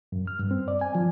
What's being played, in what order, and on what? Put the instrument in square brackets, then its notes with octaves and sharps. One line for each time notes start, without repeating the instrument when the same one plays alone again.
[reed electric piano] F#2
F6
G2
C4
D5
G#5
F3